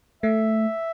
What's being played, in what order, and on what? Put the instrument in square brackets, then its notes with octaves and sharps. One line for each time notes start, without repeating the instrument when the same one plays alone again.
[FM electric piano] A3 [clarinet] E5